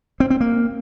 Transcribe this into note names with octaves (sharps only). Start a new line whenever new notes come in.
C4
C4
A#3